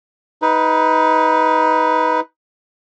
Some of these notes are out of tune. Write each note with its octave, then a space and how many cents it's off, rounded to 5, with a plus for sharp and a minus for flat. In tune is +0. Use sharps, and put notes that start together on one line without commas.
D#4 +20 B4 +0